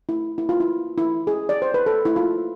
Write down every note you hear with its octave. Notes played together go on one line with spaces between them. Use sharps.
E4
E4
F4
E4
E4
G#4
D5
C5
B4
A4
E4
F4